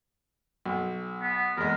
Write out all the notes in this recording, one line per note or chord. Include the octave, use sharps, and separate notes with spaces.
B1
B3
E2 G#3 A#4